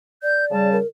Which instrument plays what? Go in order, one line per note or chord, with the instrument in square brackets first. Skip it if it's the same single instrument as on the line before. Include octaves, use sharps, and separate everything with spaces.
[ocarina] D5 [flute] G6
[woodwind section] C#3 G3 [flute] A5
[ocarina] A#4